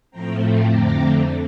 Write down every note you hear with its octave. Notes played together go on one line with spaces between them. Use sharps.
A2 F3 A3 C4 G5 A#5
F2 D3 A3 C4 A#5 D6